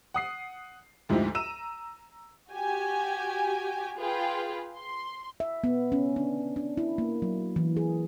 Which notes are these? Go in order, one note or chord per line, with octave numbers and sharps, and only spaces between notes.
F#5 D#6 C7
D2 G#2 F3 D#4 E4 G4
A#5 E6 D#7 E7
F#4 G4 G#5
F4 G#4 B4 F5 G5
C6
E5
B3
C#4
D4
D4
E4
A#3
F#3
E3
G#4